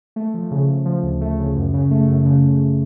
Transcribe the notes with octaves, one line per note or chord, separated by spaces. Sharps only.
A3
F3
C#3
C#3
F3
D2
A3
C#3
F#2
C#3
A3
F#2
C#3
C#3